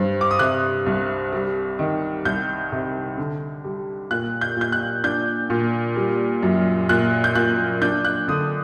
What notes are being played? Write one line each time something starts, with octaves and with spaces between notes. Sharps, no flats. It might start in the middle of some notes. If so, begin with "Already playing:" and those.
Already playing: G2 C4
D6
D#6
C3 F#6
C2
G3
D#3
C2 G6
C3
D3
G3
A#2 F#6
G6
A#2 G6
F#6
D4 G6
A#2
G3
F#2
A#2 F#6
G6
A#2 F#6
D4 G6
F#6
D3 D#6